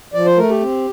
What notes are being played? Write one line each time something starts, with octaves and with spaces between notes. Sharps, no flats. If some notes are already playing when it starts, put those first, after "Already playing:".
F3 D5
C5
A3 A#4
G4
C4